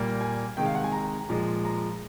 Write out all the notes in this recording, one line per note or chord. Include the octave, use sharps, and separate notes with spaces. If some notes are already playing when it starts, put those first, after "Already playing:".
Already playing: A#2 G3 A#3
G#5
C3 D#3 G#3 G5
F5
F#5
G#5
A#5
A#2 F3 G#3
A#5